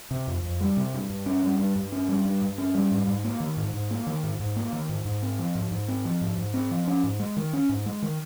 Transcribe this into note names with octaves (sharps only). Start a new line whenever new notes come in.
C3
F2
F2
G3
C3
G2
G2
C#4
G3
G2
G2
C#4
G3
G2
G2
C#4
G3
G#2
G#2
A#3
D#3
G#2
G#2
A#3
D#3
G#2
G#2
A#3
D#3
G#2
G#2
C4
F3
G#2
G#2
C4
F3
G#2
G#2
C4
F3
C#4
G#2
G#3
D#3
C#4
G#2
G#3
D#3